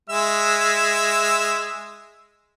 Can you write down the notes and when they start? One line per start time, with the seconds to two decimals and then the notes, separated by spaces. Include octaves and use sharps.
0.10 G#3 E5 E6